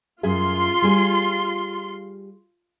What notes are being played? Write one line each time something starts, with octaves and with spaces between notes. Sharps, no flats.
F#2 F4 G#4 E5 C6
G3 G#4